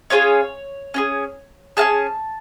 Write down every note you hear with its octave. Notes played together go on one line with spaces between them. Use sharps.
C#4 F4 G#4 C#5
C#4 F4 G#4
C#4 F4 G#4 A5